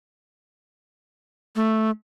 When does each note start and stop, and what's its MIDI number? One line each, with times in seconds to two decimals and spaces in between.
1.56 1.90 57